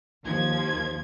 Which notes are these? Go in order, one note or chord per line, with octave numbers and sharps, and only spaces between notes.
D#2 F3 G#6